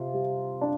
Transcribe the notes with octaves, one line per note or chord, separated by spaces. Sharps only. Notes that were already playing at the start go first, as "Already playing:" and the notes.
Already playing: C3 F4
G3
D4